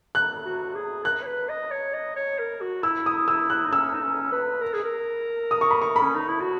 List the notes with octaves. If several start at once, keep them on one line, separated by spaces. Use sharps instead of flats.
F#6
F#4
G#4
A#4 F#6
C#5
B4
D#5
C#5
D#5
C#5
A#4
F#4
E4 E6
D#6
E4 E6
F#6
D#4
C#4 E6
D#4
C#4
B4
A#4
G#4
A#4
D#6
C#6
B5
C#6
B5
C#4
D#4
E4
F#4